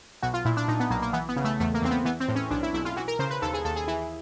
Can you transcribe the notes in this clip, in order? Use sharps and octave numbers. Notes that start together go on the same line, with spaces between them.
B1 F#4
F4
A#2 E4
D4
A#2 D#4
B3
B1 A#3
A#3
E3 B3
B3
C#3
A3
E2 A3
A#3
E2 C4
B3
E3 B3
C4
A2
C#4
B1 D4
E4
B1 E4
F4
E3 F#4
A#4
C#3 C5
B4
D#2 A4
G#4
D#2 A4
G#4
E3